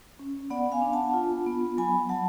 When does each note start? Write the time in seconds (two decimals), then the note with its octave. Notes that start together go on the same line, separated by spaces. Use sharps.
0.19 C#4
0.50 B3 D5 F#5
0.72 F5 G#5
0.82 D4
0.93 F#5 A5
1.14 F4
1.46 B3
1.77 F#3 G#5 B5
2.09 F#3 F#5 A5